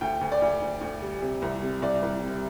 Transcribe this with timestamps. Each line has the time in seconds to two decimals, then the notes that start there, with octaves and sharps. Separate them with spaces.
0.01 D2 G5
0.21 D2
0.32 D5
0.42 D2
0.62 D2
0.81 D2
1.02 G3
1.22 C3
1.42 C2
1.62 C3
1.82 C2 D5
2.02 C2
2.23 C3